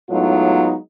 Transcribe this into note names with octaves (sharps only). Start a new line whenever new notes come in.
A2 F#3 G#3 B3 D#4 F4